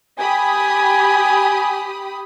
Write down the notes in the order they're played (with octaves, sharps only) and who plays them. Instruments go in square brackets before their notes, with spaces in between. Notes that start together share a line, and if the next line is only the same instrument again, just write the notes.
[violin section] G4 B5 D#6 [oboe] G#5